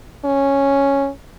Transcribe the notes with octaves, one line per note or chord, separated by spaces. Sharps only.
C#4